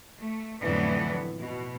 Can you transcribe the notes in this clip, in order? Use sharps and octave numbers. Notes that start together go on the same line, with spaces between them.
A3
F2 A2 D3 E3 F#3 B3
B2